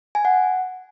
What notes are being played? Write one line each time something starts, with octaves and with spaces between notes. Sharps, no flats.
G#5
F#5